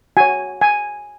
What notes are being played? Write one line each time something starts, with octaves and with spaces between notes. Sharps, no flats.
F#4 C#5 G#5
G#5